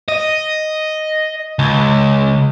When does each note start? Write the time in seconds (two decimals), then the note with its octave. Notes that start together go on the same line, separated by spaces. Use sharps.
0.08 D#5
1.59 C#2